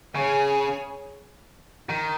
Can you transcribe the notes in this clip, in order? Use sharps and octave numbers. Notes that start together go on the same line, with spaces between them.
C#3 G#4 C#5 G#5
D#3